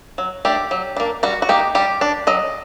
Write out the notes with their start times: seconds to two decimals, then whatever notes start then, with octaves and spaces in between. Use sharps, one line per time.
0.18 F#3
0.45 A3 D4 G4
0.71 F#3
0.96 A#3 D4
1.23 G3 F#4
1.42 F#4
1.49 A#3 D#4 G4
1.75 G3 G4
2.01 D4
2.27 F#3 D#5